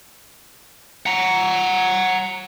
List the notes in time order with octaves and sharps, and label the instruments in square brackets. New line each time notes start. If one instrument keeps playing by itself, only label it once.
[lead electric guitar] F#5 A#5